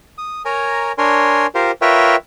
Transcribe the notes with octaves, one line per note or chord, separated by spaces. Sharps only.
D#6
A#4 C#5 G#5 A#5
D4 A#4 C#5 G#5 C6
F4 G4 A#4 C5
F4 A#4 B4 C#5 E5 G5